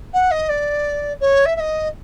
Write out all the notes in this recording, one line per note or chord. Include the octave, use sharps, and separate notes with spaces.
F#5
D#5
D5
C#5
E5
E5
D#5